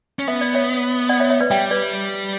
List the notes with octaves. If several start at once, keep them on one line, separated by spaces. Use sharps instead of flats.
C#4
B3 E5
D5
C#5 E5
D5 F#5
C#5 E5
C#5 E5
B4 D5
G3 E5 G5
B4 D5